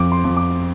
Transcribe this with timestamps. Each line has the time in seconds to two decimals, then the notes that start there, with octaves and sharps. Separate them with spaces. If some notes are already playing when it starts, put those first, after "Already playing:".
Already playing: F2 D6
0.12 C6
0.24 F2
0.37 D6